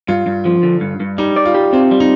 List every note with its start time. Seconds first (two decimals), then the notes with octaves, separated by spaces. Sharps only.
0.08 G2 F4
0.27 G2
0.45 F3
0.63 D3
0.81 G2
1.00 G2
1.18 G3 D#4
1.36 D5
1.45 F4
1.54 G4
1.73 C4 F4
1.91 G3
2.00 D#4